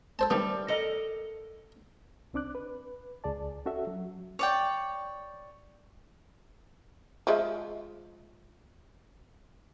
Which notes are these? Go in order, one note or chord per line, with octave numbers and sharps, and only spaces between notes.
A4 C5 A5
D#3 G3 A3 B3
A4 A#4 D#5
C2 C4 D4 D6 F#6
B4
C#2 G#4 D5 A5
C#4 F#4 A4 E5
F#3
C#5 D5 G5
F3 G#3 E5